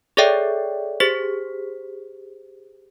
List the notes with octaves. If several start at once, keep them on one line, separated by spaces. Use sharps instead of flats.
G#4 A4 C#5 D5 E5 G5
G4 G#4 C5 B6